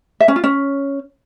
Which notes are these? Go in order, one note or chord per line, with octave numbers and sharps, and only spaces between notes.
E5
C#4
F4
C#4